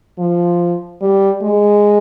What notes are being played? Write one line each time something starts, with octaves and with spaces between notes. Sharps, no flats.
F3
G3
G#3